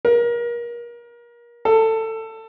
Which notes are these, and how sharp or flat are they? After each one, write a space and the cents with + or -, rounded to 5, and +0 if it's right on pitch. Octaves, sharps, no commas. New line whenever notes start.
A#4 +30
A4 +20